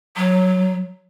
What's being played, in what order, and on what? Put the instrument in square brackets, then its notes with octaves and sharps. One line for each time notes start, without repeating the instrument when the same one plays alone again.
[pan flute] F#3